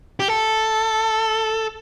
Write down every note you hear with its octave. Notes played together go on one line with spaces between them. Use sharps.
G4
A4